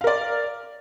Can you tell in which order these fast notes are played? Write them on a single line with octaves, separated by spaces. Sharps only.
F5 A#4 D5